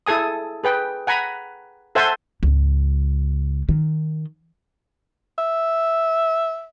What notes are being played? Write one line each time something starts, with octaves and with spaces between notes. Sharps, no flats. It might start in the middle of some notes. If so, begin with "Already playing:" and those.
E4 G#4 A4 G#5 D#6
G#4 B4 G5
F#5 G#5 A#5 B5
A4 C5 E5 F#5 G#5 A5
C#2 G#2
D#3
E5